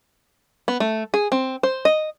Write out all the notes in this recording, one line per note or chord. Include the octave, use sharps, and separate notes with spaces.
B3
A3
G#4
C4
C5
D#5